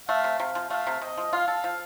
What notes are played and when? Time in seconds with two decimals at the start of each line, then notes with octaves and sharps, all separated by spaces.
0.09 A3 F5
0.24 C3
0.40 C3
0.55 F3
0.70 A3 F5
0.87 C3
1.01 C3 D#5
1.18 F3
1.33 F4 F5
1.48 A4
1.64 F3